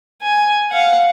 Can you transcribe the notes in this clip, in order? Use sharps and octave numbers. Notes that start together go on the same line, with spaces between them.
G#5
F5 F#5